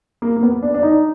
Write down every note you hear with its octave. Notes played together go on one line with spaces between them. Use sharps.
A#3
A#3
B3
D4
D4
D#4